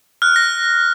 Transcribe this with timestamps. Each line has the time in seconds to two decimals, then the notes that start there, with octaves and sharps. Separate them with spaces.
0.22 F6 F#6
0.36 A#6